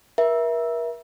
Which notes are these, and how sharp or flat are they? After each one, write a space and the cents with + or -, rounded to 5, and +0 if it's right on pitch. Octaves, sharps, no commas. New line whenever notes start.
A#4 +40 E5 +0